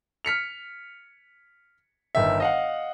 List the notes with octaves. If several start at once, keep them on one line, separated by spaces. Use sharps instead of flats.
F6 B6 C#7 F7
G1 D#3 E5
D#5 F5 F#5